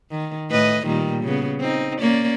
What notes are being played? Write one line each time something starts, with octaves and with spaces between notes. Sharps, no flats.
D#3
A2 B4 D#5
A#2 D#3 G3
C#3 B3
C4 D#4
A#3 C#4 D5